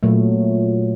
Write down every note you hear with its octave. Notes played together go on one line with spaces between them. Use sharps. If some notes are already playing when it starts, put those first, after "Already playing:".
A#2 F#3 A3